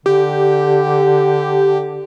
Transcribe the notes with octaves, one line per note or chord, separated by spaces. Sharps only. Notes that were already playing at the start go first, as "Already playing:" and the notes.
D3 G4